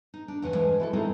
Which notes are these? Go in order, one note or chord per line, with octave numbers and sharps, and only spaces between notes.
D#4
D4
E2 C#3 F#5 G#5
E3 F3 G#3
E4 F#4 A4
G#3 A#3 C4 D#4 E4 A4